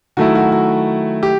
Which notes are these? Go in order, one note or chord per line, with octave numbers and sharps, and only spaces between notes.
D#3 F#3 A3 E4 F#4
F#4
F#4
G4